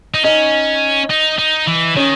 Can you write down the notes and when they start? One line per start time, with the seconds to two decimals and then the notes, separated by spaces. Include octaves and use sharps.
0.14 D#4
0.24 C#4 D#4
1.10 D#4
1.38 D#4
1.67 E3
1.96 D#3 C#4